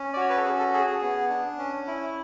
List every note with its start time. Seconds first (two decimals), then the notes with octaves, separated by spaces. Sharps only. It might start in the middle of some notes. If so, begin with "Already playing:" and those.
Already playing: C#4
0.13 D5
0.17 F#4 C#5
0.30 B4
0.37 A4
0.44 C#4 G#4
0.59 A4
0.74 G#4 A4
0.87 G#4
1.02 B3
1.30 D4
1.58 C#4
1.87 E4